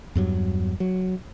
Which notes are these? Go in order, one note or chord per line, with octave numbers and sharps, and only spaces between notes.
E2 G2 F#3
F#3